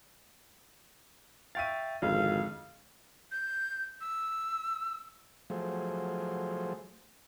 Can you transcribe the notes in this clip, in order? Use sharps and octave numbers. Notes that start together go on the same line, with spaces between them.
E5 F5 G5 C#6 A6 D#7
G#1 F2 D3 G#3 F5
G6
E6
F3 F#3 A3 G#4 C5